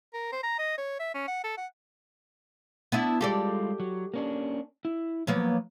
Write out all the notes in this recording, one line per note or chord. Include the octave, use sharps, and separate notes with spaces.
A#4
C5
A#5
D#5
C#5
E5
C#4
F#5
A4
F#5
B3 D4 E4
G3 G#3 F4 G4 A4 D5
F#3
A#3 C#4 D4
E4
F3 F#3 A#3 B3 C#5